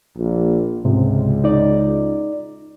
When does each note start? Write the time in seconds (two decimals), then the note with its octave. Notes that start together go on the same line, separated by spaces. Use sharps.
0.17 A#1
0.85 C#2 G#2 C3
1.44 D#4 D5